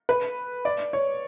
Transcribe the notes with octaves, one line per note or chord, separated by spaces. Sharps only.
B4
D5
C#5